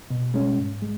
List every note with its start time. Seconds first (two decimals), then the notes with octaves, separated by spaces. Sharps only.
0.10 B2
0.34 G#3 C#4
0.58 G#2
0.82 G#3